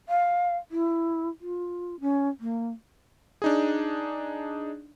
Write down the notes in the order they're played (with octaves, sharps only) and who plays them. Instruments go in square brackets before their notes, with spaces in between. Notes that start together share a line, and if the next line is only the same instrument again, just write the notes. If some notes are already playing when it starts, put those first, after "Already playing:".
[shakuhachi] F5
E4
F4
C#4
A#3
[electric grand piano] D4 D#4 G#4